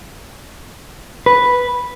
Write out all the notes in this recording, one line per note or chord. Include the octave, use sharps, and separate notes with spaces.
B4